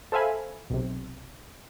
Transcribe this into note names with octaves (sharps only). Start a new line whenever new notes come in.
A4 C5 E5 F5 G#5 B5
B1 C3